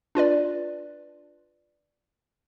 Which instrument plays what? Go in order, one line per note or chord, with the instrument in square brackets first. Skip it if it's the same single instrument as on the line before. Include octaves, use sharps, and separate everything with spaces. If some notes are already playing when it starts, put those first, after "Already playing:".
[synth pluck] D4 F4 B4 D5